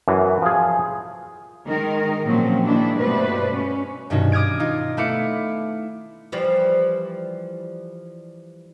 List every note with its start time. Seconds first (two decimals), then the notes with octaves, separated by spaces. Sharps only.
0.08 F#2 E3
0.42 F3 G#4
1.68 D#3 G#3 A#4
2.25 A#2 F3 F#3 C4 C#4
2.64 D#3 G#3 A#3 D4 E4
2.99 G2 B2 A3 B4 C5 D5
3.51 C#4
4.10 G2 B2 D#3 C#4 D#4 F#4
4.32 D6 D#6 F6 G#6 D7
4.60 D#4 F4
4.97 A3 B3 E4 F5 D6 C#7
6.32 E3 F3 G3